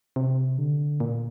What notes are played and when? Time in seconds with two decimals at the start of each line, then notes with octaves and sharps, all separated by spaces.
0.16 C3
0.58 D3
1.00 A#2